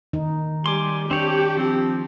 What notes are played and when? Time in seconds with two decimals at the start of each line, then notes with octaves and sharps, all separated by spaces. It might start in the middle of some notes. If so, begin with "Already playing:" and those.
0.13 D#3 D#4
0.66 G3 G#5 C6 D6
1.11 C4 D4 G4 C#5 D5 G5
1.57 F3 C4